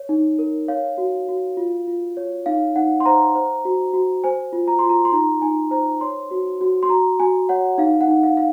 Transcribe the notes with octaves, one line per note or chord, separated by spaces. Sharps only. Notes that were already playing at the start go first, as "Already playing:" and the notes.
Already playing: C#5
D#4
A#4
C#5 F5
F#4
F#4
F4
F4
C#5
D#4 F5
D#4 F#5
C6
C5 A#5
C5
F#4
F#4
C5 G#5
F4
A#5
F4 C6
A#5
C6
D#4 A#5
D#4 G#5
C5 A#5
C#5 C6
F#4
F#4
C6
F#4 A#5
F#4 G#5
C#5 F#5
D#4 F5
F#5
D#4
F5
F5